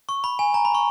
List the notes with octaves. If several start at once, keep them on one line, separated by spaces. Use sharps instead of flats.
C#6
B5
G#5
A#5
B5
C#6